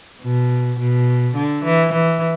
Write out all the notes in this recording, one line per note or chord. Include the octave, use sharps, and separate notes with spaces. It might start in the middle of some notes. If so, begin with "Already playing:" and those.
B2
B2
D3
E3
E3